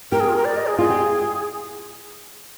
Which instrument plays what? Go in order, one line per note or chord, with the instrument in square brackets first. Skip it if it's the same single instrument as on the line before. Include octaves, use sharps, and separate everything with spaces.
[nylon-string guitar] G4 [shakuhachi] A#4
[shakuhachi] G#4
F4
A#4
D5
D#5
G#4
[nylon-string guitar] F4 [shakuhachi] G#4
[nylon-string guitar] G4